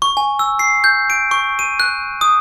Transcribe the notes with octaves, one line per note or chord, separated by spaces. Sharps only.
C#6
G#5
E6
C7
G6
D7
C#6
D#7
F#6
D#6